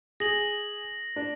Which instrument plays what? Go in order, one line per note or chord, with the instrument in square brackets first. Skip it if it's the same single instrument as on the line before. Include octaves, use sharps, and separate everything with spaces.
[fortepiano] G#4 [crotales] A#6 F#7
[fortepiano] D4